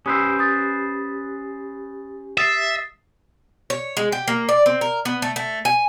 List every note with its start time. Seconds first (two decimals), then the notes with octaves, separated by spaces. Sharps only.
0.06 C#4 G4 B4 C5 D#6 E6
0.39 D#6 A6
2.38 E5 D#6 A6 C7
3.70 C#5
3.97 G#3
4.12 G4
4.28 A#3
4.49 D5
4.66 C4
4.81 A#4
5.05 B3
5.22 A3
5.36 A3
5.65 G#5